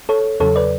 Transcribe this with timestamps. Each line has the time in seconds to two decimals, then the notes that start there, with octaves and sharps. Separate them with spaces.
0.09 A4 C#5
0.40 E2 C#3 F#3 A4 C#5
0.56 B4 D5